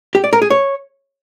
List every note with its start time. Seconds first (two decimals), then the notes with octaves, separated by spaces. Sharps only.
0.15 G4
0.24 D5
0.33 A#4
0.42 G#4
0.50 C#5